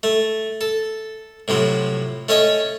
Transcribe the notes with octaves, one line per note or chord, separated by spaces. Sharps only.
A3
A4
A2 C3 F3 F#3
A3 C#4 C#5 D#5